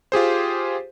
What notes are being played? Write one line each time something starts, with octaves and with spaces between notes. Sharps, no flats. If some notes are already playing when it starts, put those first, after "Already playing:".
F4 G4 G#4 C5